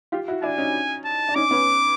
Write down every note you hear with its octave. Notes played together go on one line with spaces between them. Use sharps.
F4 G4
E4 F#4
D4 E4 G#5
C#4 D#4
A5
D4
C#4 D#4 D6
B3 C#4